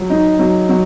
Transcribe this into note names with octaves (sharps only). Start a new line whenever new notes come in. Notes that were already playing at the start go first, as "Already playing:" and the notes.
Already playing: F#3
D#4
F#3
F#3